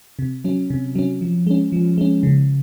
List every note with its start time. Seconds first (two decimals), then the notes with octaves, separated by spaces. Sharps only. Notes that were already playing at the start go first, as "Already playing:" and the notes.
0.19 C3
0.44 F#3 C#4
0.70 C3
0.95 F#3 C#4
1.21 F3
1.47 G#3 C#4
1.72 F3
1.98 G#3 C#4
2.23 C#3